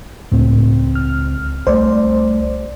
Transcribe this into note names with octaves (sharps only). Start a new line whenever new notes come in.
C#2 A2 C4
F6
C2 A3 C5 D5